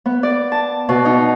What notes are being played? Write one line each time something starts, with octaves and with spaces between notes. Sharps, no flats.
B3
D5
A5
B2
D#4